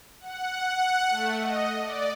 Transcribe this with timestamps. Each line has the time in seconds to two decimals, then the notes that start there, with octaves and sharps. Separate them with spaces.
0.20 F#5
0.68 F#5
1.10 A3
1.40 D#5
1.82 D5